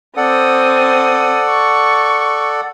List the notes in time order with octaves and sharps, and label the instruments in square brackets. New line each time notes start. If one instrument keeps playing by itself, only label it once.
[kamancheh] C4 D#6 [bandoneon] A4 D5 F#5
[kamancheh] C#6